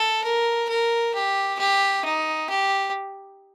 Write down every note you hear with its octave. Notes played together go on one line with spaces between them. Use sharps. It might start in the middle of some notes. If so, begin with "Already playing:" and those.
Already playing: A4
A#4
A#4
G4
G4
D#4
G4